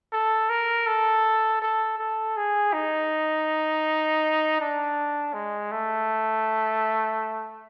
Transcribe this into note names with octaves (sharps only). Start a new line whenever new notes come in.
A4
A#4
A4
A4
A4
G#4
D#4
D4
G#3
A3